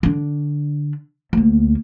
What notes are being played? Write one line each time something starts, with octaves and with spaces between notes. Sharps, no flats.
D3 D4
D2 A#3